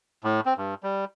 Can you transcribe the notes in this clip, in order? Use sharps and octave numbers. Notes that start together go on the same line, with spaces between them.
A2
C4
G2
G3